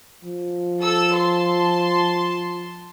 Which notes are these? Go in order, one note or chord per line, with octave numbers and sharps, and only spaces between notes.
F3
A4 E6
A5 C6